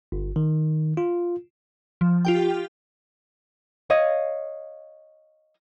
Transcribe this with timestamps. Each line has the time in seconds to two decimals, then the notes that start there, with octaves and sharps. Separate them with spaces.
0.12 G1
0.36 D#3
0.97 F4
2.01 F3
2.25 F4 G4 G5
3.90 C#5 D#5 F5